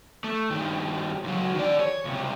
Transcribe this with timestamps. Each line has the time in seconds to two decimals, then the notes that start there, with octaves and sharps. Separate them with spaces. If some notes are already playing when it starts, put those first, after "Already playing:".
0.24 A3
0.50 G2 D#3
1.24 C#2 F#3
1.55 D#3 D5
1.80 C#5
2.05 C#2 C3